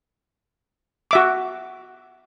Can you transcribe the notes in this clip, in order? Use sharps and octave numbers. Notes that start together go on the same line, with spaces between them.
F#4 E5 D6